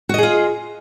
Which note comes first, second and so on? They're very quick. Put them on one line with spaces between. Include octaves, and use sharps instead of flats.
F#4 D#5 G#4 F4